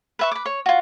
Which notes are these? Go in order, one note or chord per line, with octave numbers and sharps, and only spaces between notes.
B4 E5 C#6
B4 D6
C#5
F4 F#4